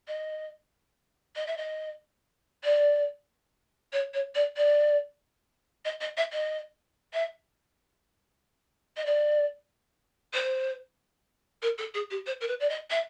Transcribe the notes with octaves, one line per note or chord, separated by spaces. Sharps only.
D#5
D#5
E5
D#5
D5
C#5
C#5
D5
D5
D#5
D#5
E5
D#5
E5
D#5
D5
C5
A#4
A4
G#4
G4
C5
A#4
B4
D5
D#5
E5